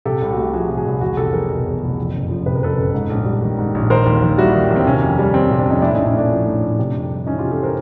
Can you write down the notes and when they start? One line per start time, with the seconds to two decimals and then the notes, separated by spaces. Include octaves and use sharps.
0.05 C3 G4 A4
0.22 C2
0.33 F#4
0.38 A3 G4
0.54 F3 F#4 G#4
0.69 C3
0.77 F#4 G#4
0.85 C2
1.01 E2 F#4 G#4
1.17 F1 G4 A4
1.33 F#3 G#4 A#4
1.50 B2
1.66 E2
1.82 F1
1.98 F2
2.15 F#1
2.30 F3
2.46 C3 B4
2.55 A#4
2.62 F2 A4 B4
2.77 F#1
2.95 G#2
3.10 A#1
3.26 G3
3.42 D#3
3.59 G#2
3.75 A#1
3.90 D#3 A#4 C5
4.06 D#2
4.22 D#2
4.38 G3 E4 F#4
4.55 D#3
4.71 D#2
4.76 C4
4.87 C3 C#4
5.03 F2
5.19 G3
5.34 D#3 C4
5.51 C3
5.59 C4 D4
5.67 F2 C#4 D#4
5.82 A2 D4 E4
5.94 C#4 D#4
5.98 A#1
6.07 C#4
6.14 A3 C4 D4
6.31 F3
6.47 A2
6.63 A#1
6.79 C3
6.95 F2
7.10 G3
7.26 E3 C#4 D#4
7.39 F4 G4
7.43 C3
7.51 G4 A4
7.63 A#4 C5